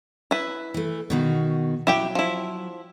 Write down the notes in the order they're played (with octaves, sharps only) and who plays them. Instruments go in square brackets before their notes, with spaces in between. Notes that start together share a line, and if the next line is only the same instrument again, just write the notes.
[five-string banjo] E4 B4
[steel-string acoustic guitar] E3 A3
B2 D#3 F#4
[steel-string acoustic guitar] F#3 [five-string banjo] E4 G4 G5
[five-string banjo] F3 E4